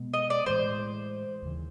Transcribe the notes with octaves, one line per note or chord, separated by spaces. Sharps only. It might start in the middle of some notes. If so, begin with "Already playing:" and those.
Already playing: B2 G#3 B3
D#5
D5
A2 E3 G#3 C5
D#2 C#3 E3